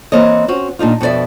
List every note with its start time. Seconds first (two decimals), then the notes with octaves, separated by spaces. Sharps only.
0.12 E3 A#3 C4 C#5 D#5
0.48 C4 C#4 F#4
0.79 A#2 D4 D#4 F4
1.01 F2 B2 D#4 D5 E5